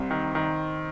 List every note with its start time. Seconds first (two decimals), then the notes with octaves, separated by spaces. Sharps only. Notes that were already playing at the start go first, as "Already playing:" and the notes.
Already playing: C2 C4
0.11 D#3
0.35 D#3